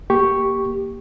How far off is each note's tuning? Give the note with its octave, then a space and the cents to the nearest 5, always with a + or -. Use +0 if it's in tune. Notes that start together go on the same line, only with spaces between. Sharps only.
A#3 +0 G4 +0 C#6 +0